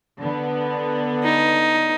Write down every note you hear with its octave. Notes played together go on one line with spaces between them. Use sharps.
D3 B3
D#4